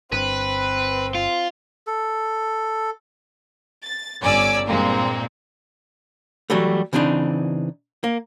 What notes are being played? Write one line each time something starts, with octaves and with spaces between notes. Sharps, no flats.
G1 C4 B4
F4
A4
A6
G1 C#4 D5 G#5 D6 E6
G2 A#2 G#3 A#3 C4
E3 F#3 G3 A3
C#3 E3 C4 D4 D#4
A#3